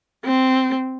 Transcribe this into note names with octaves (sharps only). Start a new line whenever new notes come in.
C4